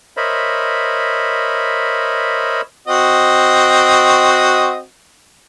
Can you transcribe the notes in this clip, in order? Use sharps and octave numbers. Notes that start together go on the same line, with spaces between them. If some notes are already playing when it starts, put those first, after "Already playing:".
A#4 C5 C#5 D#5 E5 B5
C4 F#4 D#5